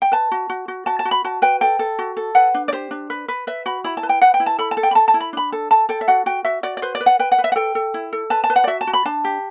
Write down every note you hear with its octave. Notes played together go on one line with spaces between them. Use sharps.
G5
B4 A5
F#4
F#4
F#4
F#4 A5
A5
F#4
B5
F#4 A5
B4 G5
A4 G5
A4
F#4
A4
B4 F#5
D4
D5
G4 C5
D4
B4
B4
B4 E5
F#4 B5
E4 B5
A5
B4
G5
B4 F#5
G5
E4
A5
A4 B5
A5
A4
G5
B5
A4 A5
A5
E4
B5
D4 B5
A4
A4 A5
A4 G5
E5
F#4 F#5
F#4 G5
F#4 E5
F#4 D5
D5
B4 C5
D5
B4
F#5
B4 G5
F#5
B4
E5
F#5
A4 G5
A4
E4
A4
B4 A5
A5
B4
F#5
D5
F#4 E5
A5
F#4
B5
D4 A5
G4